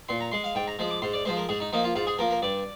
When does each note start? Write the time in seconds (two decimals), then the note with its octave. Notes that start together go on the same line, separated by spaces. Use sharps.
0.09 A#2 C6
0.21 A#5
0.32 G#3 C6
0.44 F5
0.55 G#2 G5
0.68 A#5
0.79 F3 G#3
0.90 D6
1.02 G#2 C6
1.14 D5
1.25 F3 G#3 C5
1.37 A#4
1.49 G#2 G#4
1.60 D#4
1.73 F3 A#3 D#4
1.84 F4
1.96 G#2 F4
2.07 G#4
2.19 F3 A#3 A#4
2.31 A#4
2.42 G2 D5